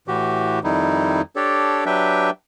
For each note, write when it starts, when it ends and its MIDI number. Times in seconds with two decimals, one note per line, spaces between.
0.08 0.59 45
0.08 0.59 52
0.08 0.59 66
0.08 0.59 67
0.64 1.22 41
0.64 1.22 51
0.64 1.22 55
0.64 1.22 63
0.64 1.22 64
1.36 1.84 62
1.36 1.84 67
1.36 1.84 69
1.36 1.84 73
1.36 1.84 74
1.86 2.30 54
1.86 2.30 62
1.86 2.30 67
1.86 2.30 71
1.86 2.30 76
1.86 2.30 79